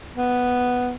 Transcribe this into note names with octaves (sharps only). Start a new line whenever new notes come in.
B3